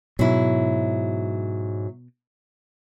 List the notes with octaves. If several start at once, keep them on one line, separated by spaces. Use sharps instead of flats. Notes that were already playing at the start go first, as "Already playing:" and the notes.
G#2 B2 F#3 E4